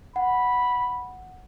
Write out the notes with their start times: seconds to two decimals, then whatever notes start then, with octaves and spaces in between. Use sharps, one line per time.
0.16 F#5 B5